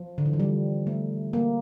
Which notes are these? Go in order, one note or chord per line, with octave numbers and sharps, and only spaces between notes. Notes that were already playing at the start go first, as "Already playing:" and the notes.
Already playing: F3
D3
E3
F3
G3
A3
A#3